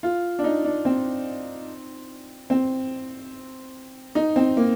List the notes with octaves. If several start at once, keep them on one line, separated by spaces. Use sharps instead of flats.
F4
D4
D#4
D4
C4
C4
D#4
C4
A#3